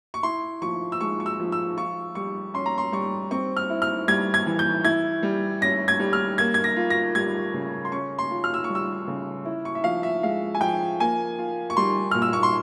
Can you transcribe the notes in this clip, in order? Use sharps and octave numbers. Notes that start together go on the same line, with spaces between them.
C#6
E4 C6
F3 C#6
E6
G#3 C#6
C#6
E6
F3
E6
F4 C#6
G3 C#6
C#4 C6
A#5
C6
G3 C#6
C4 C#6
F6
E4
F6
G3 G#6
G#6
E3
G6
E4 G#6
G3
C#4 A#6
G#6
G3
F6
A#3 G#6
G#6
A#6
F4
A#6
G3 G#6
C#3
C6
C#4 C#6
C6
F4
F6
E6
C#6
G3
E6
C#3
E4
C#6
E5
F3 F5
E5
G#3 F5
G#5
F3 G5
A#3 G#5
F4
C#6
G3 C6
A#2 F6
E6
C#6
C6